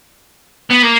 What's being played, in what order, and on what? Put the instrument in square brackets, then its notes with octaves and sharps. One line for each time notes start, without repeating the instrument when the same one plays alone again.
[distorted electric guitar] B3
A#3